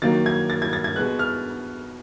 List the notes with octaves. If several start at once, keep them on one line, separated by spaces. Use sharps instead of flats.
D#3 F#3 A#3 A6
G#6
A6
G#6
A6
G#6
B2 G#3 B3 F#6
F6